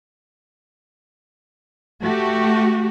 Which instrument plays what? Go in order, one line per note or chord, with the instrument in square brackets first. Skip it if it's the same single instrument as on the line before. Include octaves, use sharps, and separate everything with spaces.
[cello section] A3 F#4 G4